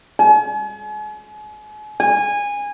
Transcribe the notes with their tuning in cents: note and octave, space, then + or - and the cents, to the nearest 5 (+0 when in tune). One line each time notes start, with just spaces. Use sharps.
G#5 +40
G#5 -20